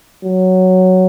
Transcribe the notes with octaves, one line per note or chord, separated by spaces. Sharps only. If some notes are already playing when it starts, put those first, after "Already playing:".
F#3